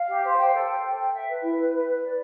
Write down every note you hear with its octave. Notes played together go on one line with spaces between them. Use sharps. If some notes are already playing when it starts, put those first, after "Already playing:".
Already playing: F5
G4
C5
G5
A4
G5
A4
G5
E5
B4
E4
B4
B4
B4
D5